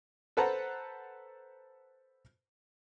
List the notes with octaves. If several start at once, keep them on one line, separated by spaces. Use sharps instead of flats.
A4 B4 C5 F#5 A5 A#5